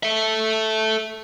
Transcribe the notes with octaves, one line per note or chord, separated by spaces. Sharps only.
A4 E5